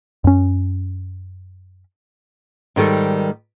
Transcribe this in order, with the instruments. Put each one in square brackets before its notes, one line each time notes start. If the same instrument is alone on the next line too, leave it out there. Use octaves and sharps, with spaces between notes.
[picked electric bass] F#2 C#4
[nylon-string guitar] G#2 D#3 G3 A4